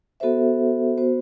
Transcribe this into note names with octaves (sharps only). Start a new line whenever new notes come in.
B3 F#4 A4 C5 E5
B3 F#4 C5